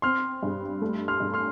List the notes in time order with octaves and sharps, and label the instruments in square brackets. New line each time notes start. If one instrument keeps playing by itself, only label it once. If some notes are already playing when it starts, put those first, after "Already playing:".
[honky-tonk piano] C4 [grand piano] C6 F6
[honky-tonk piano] G2
A3
[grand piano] C6 F6
[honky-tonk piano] G2
[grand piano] C6 F6